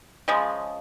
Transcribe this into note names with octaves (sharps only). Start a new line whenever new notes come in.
C#3 F3 G#3